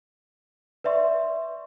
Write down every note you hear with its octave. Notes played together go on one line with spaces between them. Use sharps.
B4 D5 E5 C6 C#6